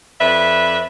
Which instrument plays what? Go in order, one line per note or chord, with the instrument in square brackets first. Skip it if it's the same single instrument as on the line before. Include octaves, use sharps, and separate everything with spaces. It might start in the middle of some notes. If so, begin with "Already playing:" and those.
[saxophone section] F2 B4 D5 E5